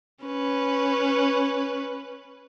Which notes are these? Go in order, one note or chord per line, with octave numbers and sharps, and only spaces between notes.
C#4 B4